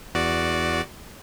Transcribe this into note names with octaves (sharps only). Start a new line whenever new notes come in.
E2 F#4 D5